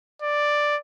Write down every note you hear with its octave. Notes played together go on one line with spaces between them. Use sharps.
D5